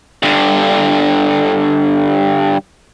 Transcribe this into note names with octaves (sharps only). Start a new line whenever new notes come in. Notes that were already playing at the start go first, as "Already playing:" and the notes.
G2 D3